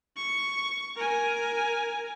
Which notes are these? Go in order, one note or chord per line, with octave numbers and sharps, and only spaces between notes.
C#6
A#4 G#5